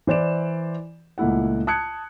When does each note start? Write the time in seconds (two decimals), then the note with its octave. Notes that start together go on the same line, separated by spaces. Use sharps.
0.07 E3 C5 D5 E7
1.18 C#2 A#2 A3 E4 F#5
1.67 A5 D#6 F#6 G#6 C#7